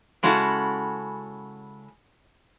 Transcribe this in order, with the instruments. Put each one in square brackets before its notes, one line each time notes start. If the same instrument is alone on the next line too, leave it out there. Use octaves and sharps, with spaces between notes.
[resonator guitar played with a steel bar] C#3 G#3 C#4 E4 F#4 A4